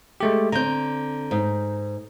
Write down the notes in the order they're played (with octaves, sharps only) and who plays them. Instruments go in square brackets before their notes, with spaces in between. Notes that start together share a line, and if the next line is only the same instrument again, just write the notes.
[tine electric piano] G#3 A3 G4
[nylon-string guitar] D3 C4 [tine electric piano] A#5 G6
[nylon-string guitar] G#2